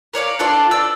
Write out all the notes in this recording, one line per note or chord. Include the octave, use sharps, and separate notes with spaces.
A#4 C#5 D5 F5
D4 F4 A4 D5
D5 E6